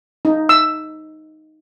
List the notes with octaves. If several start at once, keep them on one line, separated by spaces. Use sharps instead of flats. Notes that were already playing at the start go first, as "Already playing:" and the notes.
D#4
E6